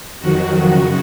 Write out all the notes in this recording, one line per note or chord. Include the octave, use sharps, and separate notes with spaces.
F2 D#3 F#3 F#4
F#2 C#3